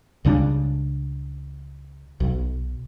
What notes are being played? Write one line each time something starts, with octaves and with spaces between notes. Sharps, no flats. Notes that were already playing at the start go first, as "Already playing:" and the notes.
C#2 C#3 G3 D4
B1